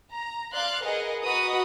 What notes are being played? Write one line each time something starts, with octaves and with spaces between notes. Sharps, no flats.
A#5
D5 F5 C6 F#6
G#4 A#4 B4 D#5 F#5
F#4 B4 D#5 A#5 B5 D#6